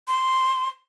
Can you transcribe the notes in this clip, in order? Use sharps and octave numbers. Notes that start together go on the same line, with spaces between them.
C6